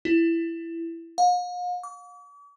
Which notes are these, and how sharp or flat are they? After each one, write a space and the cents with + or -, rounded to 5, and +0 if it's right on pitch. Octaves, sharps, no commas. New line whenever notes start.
E4 +15
F5 +45
D6 -45